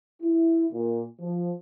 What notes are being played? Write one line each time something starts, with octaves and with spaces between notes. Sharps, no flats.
E4
A#2
F3